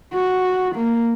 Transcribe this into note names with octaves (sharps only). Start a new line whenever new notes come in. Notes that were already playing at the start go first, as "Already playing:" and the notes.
F#4
A#3